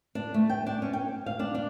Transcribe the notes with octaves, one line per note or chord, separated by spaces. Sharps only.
D4
A3
G5
D4
C#4
G5
F5
D4
D4